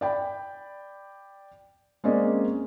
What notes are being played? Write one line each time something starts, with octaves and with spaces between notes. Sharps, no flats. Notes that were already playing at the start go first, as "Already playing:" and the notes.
D5 G5 B5
G#3 A#3 C4 C#4 D5 D#5